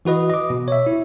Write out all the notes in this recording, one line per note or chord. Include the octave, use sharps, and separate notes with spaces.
E3 F#4 B4 D#5
D#5 D6
B2
C#5 E5
E4